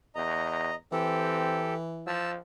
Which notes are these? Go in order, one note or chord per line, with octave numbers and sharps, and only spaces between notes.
E2 D#5 A#5
E3 C4 G4 A4
F3 A5 E6